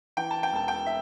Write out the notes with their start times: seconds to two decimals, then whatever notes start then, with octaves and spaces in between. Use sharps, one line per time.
0.17 E3 G5
0.31 A5
0.43 G5
0.53 E1 A5
0.68 G5
0.86 E5